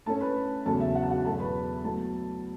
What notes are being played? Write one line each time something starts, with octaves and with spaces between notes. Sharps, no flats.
A2 A3 C#4 A4 A5
B4 B5
E2 C#3 F#3 A3 A4 A5
E5
F#5
A5
F#4 F#5
E2 B2 F#3 A3 A4 A5
B4 B5
A2 F#3 B3 A4 A5